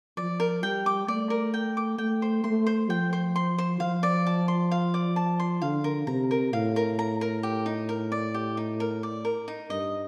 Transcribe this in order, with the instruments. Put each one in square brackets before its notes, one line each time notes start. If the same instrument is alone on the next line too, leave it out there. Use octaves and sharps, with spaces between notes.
[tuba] F3 [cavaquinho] D5
[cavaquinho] A#4
[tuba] G3 [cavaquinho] G5
[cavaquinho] D6
[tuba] A3 [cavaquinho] D5
[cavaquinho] A#4
G5
D6
[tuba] A3 [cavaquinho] G5
[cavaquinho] C5
[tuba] A3 [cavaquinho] C6
[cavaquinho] C5
[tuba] F3 [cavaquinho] G5
[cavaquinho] C5
C6
C5
[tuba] F3 [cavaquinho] F5
[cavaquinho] D5
A5
C6
F5
D5
A5
C6
[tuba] D3 [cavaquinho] F5
[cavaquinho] A#4
[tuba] C3 [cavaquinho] A#5
[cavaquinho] A#4
[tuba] A2 [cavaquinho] F5
[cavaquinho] A#4
A#5
A#4
G4
D#4
A#4
D5
G4
D#4
A#4
D5
A#4
D#4
[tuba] G2 [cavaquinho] D#5